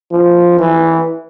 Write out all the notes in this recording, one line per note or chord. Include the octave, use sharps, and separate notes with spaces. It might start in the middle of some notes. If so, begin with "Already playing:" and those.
F3
E3